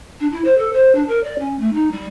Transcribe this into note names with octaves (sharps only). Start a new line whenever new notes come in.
D4
E4
C5
A4
C5
D4
A#4
D5
C#4
A3
D#4
G3